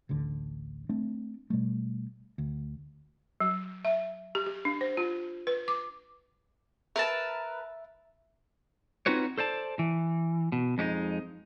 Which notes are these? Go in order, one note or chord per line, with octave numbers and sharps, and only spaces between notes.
A1 D2 D3
A3 C4 D4
B2 G3 A3
D2
F#3
E5
G4
G4
D4
C5
F4
B4
D6
A#4 B4 E5 A5
C4 D#4 F4 F#4 B4 C#5
A4 C5 D5 A5
E3
B2
F2 G#3 C#4 D#4